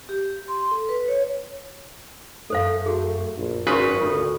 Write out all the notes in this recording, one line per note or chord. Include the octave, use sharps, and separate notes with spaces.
G4
C6
A4
B4
C#5
F#2 A3 A4 C5 F5
F#4 G#4
A#1
G#1 F#2 C#3 C#4 F4 B4 C6
D2 F4 A4